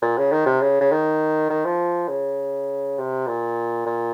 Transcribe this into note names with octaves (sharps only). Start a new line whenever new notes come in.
A#2
C#3
D#3
C3
C#3
C#3
D#3
D#3
F3
C#3
C3
A#2
A#2